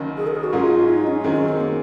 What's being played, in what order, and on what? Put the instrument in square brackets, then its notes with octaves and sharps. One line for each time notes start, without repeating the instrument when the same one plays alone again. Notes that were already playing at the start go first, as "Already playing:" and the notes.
Already playing: [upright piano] F#1 F#2 D#3
[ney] G#4
A#4
G#4
F#4
[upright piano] G#2 F#3 C#4 G#4 [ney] F4
[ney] D#4
C#4
C#4
[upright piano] F#2 D#3 G#3 [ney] C4
[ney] C#4
C4
A#3